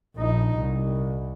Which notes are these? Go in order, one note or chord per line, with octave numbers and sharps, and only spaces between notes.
A#1 D#4
C2